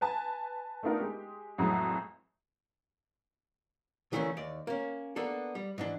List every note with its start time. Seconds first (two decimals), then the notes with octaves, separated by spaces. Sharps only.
0.01 B4 G#5 A5
0.83 A3 B3 D4 D#4 F4 A#4
1.00 G#3 G4
1.58 F2 A2 E3 F#3 G#3
4.12 D2 E3 G3 A3 A#3 C#4
4.37 D#2 D5
4.67 A#3 C#4
5.16 A#3 B3 D4 A4
5.55 G3
5.78 G#2 E3 D4